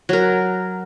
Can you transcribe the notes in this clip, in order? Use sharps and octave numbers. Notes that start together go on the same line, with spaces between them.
F#3 A#4